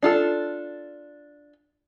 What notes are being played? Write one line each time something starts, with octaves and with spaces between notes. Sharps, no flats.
D4 F4 A4